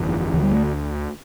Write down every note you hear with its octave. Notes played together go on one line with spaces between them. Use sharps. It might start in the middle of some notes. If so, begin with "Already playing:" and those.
Already playing: G1 F2 D3 E3
D2 D3 E3
G3
A3